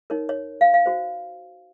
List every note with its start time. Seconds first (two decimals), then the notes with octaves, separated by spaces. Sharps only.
0.10 D#4 A#4 C#5
0.29 C#5
0.61 F5
0.74 F5
0.86 F#4 C5